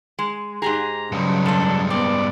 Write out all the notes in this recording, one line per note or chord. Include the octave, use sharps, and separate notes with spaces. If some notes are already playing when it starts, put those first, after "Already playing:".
G#3
G#2 G4 G#4 A#5
G2 C#3 F#3 G#3
F2 D4 A4
B3 C4 D5